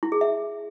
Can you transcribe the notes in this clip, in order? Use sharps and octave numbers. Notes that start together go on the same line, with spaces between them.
E4
G#4
E5